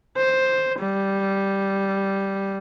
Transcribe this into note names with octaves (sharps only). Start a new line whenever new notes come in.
C5
G3